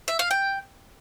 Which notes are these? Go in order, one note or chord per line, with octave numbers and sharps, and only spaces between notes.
E5
F5
G5